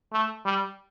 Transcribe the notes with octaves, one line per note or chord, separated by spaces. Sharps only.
A3
G3